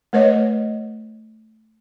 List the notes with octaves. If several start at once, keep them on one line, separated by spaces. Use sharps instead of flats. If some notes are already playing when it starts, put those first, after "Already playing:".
A3 B4 C#5 D#5